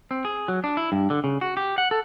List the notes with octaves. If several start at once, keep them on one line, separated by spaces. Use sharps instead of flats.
C4
G#4
F#3
D4
E4
G2
D3
C#3
F#4
G4
F#5
A4